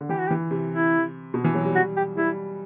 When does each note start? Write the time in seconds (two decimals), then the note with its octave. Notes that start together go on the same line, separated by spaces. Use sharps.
0.01 D3
0.09 E3 G4
0.18 F#4
0.27 G4
0.31 E3
0.51 C3
0.72 E4
1.34 B2
1.44 E3
1.55 F#3
1.64 G3
1.75 F#4
1.96 G4
2.17 G3 E4